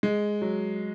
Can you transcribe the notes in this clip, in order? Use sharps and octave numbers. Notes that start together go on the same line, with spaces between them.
G#3
F#3